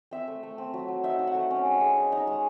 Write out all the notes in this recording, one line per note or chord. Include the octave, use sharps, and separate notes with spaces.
C4 E5
A3
A3
C4
F#3
F#3
D#4 E5
D#4
F#5
A3
C#4
G#3
G#3
D#4
D#4
G#3